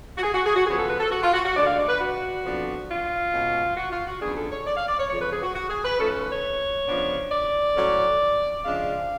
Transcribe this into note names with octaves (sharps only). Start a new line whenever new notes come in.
F#4
G#4
F#4
G#4
F#4
F#2 C#3 F3 B3 G#4
A4
B4
A4
F#4
F4
F#4
F#4
D2 D3 G#3 D4 D5
F5
D5
B4
F#4
F2 F3 B3 D4
F4
B2 G#3 C#4
F#4
F4
F#4
F#2 F3 B3 D4 G#4
A4
C#5
D5
F5
D5
C#5
F2 C#3 F3 C#5
B4
G#4
F#4
F#4
G#4
B4
G#2 F3 A3 C#4 A4
B4
B4
C#5
C#3 F3 B3 D4
D5
A2 F#3 C#4
C#3 F3 G#3 D4 F5